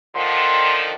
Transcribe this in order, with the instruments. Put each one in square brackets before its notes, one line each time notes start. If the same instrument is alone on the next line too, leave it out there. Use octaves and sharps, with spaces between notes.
[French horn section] D3 D#3 F3 [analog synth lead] C6